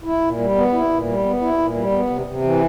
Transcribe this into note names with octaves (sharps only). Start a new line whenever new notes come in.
E4
A#2
G3
B3
E4
A#2
G3
B3
E4
A#2
G3
B3
C3
C3
E3